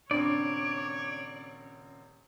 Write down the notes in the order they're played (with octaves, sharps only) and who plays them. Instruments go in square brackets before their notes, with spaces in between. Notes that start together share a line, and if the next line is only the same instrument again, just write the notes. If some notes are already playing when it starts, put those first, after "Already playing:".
[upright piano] D#1 C#3 C4 [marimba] D4 [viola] C#5 [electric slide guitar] D5